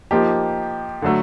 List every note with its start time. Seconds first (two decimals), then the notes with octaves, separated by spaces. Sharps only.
0.11 F3 A#3 D#4 G4
1.02 D3 F#3 A3